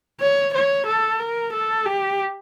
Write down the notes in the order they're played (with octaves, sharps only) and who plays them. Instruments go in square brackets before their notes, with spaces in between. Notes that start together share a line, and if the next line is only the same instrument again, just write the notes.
[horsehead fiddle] C#5
C#5
A4
A#4
A4
G4